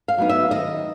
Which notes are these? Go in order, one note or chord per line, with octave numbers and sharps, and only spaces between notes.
F5
F#3 B3 D#4
E5
D#3 D#5